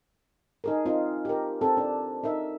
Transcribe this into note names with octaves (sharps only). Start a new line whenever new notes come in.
D#4 G#4 A#4
C4 D#4 F4
G4 A#4
C4 A4
D4
D#4 A#4 E5